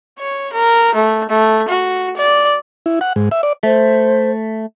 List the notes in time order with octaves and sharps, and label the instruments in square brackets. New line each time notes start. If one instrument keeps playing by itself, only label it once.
[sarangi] C#5
A#4
A3
A3
F#4
D5
[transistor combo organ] E4
F#5
G#2
E5
D5
[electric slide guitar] A3 [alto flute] C5